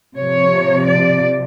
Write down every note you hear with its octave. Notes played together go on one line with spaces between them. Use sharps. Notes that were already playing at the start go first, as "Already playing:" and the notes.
C3 F3 C#5
D5